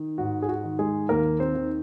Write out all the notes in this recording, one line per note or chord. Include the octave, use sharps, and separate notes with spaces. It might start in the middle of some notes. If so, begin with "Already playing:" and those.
Already playing: D#3
G#2 F#4
G#4
F#4
D#3
G#3 G#4
D#2 A#3 A#4
C4 C5
D#3